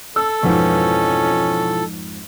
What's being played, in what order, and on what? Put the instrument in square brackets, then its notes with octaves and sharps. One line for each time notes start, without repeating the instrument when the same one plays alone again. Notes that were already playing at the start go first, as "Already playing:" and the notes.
[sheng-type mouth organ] A4 [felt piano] E6
[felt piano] F2 G#2 [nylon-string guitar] B2 E3 F3 [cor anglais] C#4